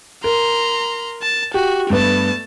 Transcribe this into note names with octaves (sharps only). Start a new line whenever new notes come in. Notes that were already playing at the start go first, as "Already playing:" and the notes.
A#4 A#5 C6
A5
F#4 G4
G2 A3 B3 A5